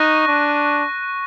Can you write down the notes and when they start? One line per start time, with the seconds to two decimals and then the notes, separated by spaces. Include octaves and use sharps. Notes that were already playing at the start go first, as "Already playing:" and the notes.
Already playing: D#4 C#6 F#6 A#6 D#7
0.28 D4